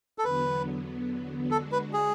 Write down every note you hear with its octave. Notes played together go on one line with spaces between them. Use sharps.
A4
E2 D3 F#3 B3 B4
D3 G#3 D4 F#4 A4
B4
G#4